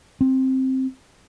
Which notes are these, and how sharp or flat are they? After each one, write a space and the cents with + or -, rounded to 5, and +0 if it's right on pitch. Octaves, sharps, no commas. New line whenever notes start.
C4 +5